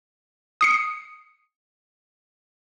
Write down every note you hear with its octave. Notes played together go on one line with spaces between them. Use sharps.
D#6 C7 C#7